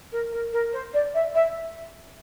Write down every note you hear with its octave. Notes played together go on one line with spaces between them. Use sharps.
A#4
A#4
A#4
C5
D5
E5
E5